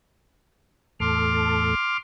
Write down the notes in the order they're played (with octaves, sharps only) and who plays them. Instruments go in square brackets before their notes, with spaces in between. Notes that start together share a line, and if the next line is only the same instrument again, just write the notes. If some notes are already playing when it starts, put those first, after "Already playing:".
[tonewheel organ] E2 A2 A4 [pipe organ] C6 D6 F6